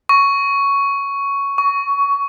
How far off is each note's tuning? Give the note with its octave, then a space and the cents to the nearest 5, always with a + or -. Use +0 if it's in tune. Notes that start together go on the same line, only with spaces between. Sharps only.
C#6 +5
C#6 +20